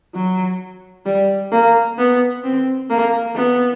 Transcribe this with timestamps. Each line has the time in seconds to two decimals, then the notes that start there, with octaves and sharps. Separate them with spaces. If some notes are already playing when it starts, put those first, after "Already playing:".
0.14 F#3
1.06 G3
1.52 A#3
1.98 B3
2.43 C4
2.90 A#3
3.35 B3